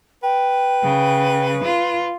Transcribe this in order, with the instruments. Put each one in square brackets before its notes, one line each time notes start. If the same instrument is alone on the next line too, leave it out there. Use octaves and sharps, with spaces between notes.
[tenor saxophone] B4 [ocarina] G5
[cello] C#3
F4